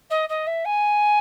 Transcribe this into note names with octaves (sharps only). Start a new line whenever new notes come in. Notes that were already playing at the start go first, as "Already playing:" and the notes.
D#5
D#5
E5
G#5